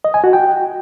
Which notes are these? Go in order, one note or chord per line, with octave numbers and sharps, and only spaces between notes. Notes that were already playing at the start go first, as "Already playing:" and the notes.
D#5
G#5
F#4
G5